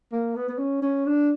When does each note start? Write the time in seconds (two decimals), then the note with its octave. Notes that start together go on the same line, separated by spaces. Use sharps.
0.12 A#3
0.36 B3
0.49 B3
0.59 C#4
0.82 C#4
1.06 D4